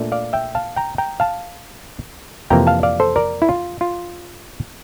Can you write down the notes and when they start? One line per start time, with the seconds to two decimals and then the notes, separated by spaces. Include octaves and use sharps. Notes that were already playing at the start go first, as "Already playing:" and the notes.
Already playing: A#2 A3 D4
0.12 D5 F5
0.33 E5 G5
0.55 F5 A5
0.76 G5 A#5
0.98 G5 A#5
1.20 F5 A5
2.50 F2 C3 E3 A#3 G5 A#5
2.67 F5 A5
2.83 D5 F5
3.00 A4 C5
3.16 A#4 D5
3.42 E4
3.49 F4
3.81 F4